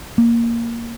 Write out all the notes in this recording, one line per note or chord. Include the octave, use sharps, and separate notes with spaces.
A#3